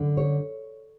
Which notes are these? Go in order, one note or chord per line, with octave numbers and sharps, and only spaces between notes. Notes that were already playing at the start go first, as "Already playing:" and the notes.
Already playing: F#2 D3
C#5